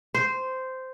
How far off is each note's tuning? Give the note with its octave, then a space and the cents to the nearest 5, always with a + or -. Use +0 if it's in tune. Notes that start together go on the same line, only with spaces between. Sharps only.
C5 -10